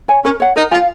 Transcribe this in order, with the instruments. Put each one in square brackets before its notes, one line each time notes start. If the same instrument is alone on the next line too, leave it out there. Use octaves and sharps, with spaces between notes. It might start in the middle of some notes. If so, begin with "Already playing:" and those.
[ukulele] C#5 G#5
[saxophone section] C#4 [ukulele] A#4
[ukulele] C#5 F#5
[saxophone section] D#4 [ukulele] A#4
[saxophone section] F4 [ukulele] G#5
[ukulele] F5